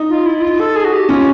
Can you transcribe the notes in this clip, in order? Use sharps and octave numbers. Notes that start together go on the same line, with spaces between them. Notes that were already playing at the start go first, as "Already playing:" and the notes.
Already playing: D#4
F4
E4
E4
F4
A4
G#4
F#4
G4
C#4 F4